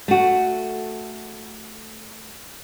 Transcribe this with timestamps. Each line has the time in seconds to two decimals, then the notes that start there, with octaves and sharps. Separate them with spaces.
0.08 A3 F#4